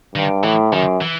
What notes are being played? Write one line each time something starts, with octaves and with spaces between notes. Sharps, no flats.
G2 D#3
A2 E3
F#2 D#3
E3